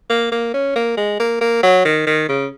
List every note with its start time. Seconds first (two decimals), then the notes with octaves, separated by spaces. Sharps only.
0.10 A#3
0.32 A#3
0.54 C#4
0.76 A#3
0.97 G#3
1.20 A#3
1.41 A#3
1.63 F#3
1.85 D#3
2.07 D#3
2.29 C#3